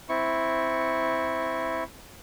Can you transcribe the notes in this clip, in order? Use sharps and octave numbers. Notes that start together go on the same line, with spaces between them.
C4 E4 C#6